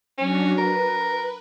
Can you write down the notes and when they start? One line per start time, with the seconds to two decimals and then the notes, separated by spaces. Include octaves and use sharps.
0.18 F#3 C#4 D4 F#4
0.58 A#4 B4